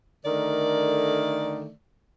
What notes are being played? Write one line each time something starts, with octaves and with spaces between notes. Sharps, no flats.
D3 D#3 A3 A#4 D5